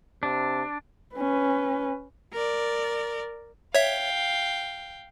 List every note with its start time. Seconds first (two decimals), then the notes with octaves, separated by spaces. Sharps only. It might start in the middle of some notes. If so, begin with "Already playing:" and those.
0.23 C3 D4
1.16 C#4 B4
2.33 A#4 D5
3.75 C#5 E5 F5 G5